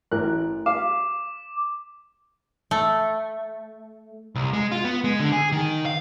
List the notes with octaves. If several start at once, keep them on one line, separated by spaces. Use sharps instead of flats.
A1 A#4 F#6
F5 D6
A3
C2
G#3
F4
B3
G#3
D3
G#4
D#3
F5